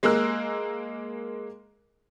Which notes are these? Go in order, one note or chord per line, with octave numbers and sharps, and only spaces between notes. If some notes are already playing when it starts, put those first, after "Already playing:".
G#3 A#3 G#4 A#4 E6 F#6